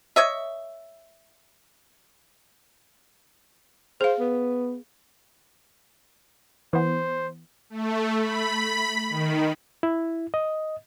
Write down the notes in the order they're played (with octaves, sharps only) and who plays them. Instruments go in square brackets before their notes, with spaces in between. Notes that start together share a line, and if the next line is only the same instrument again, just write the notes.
[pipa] C#5 D#5 E5
[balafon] G#4 F5 [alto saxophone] C5
[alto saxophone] B3
[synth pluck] E3 B3 [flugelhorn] C5
[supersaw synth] A3
B5
D#3
[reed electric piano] E4
D#5